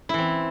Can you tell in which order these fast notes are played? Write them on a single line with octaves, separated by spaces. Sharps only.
E4 E3 C4